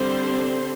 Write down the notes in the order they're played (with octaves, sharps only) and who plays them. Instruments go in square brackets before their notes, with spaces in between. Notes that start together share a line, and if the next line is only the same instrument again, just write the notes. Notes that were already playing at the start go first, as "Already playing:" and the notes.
Already playing: [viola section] D3 G3 C4 C5